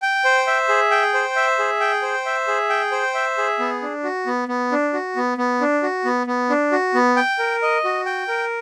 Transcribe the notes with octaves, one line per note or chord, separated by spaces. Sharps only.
G5
C5
E5
G#4
G5
C5
E5
G#4
G5
C5
E5
G#4
G5
C5
E5
G#4
B3
D4
F#4
B3
B3
D4
F#4
B3
B3
D4
F#4
B3
B3
D4
F#4
B3
G5
A#4
D#5
F#4
G5
A#4